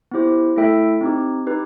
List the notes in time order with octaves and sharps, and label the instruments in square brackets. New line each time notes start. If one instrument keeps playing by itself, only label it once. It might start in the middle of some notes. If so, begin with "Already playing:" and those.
[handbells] B3 E4 G4 C5
A3 E4 A4 E5 G5
C4 D#4 G4
D#4 G4 B4